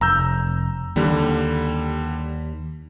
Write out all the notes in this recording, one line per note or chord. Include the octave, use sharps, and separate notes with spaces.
F1 A#5 E6 G6
D#2 D3 G3